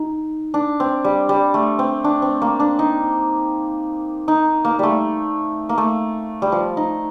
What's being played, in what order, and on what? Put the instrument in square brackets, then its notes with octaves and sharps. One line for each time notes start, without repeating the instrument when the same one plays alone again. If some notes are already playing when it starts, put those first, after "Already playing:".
Already playing: [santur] D#4
D4
C4
G3
G3
A3
C4
D4
C4
A#3
D4
D#4
D#4
A#3
G3 A3
A#3
A3
G3
F3
D#4